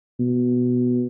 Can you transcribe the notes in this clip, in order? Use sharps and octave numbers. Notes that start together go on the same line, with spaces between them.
B2